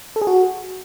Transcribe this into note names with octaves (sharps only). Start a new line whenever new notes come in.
A4
G#4
F#4